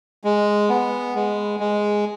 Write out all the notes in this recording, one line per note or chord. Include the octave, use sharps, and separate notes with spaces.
G#3
B3
G#3
G#3